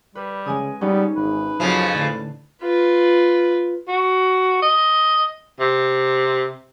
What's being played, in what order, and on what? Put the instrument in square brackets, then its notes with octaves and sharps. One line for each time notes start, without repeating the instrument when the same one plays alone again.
[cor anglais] G3 [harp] B4
[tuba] C#3 [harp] G#3 G#5 D#6
[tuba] G3 [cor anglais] B3 [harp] C#4 D#4
[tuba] G#1 [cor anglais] B4
[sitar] F2 C#3 F3 [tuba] F#3
[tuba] A2 [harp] D3
[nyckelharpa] F4 B4
[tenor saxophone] F#4
D#5
C3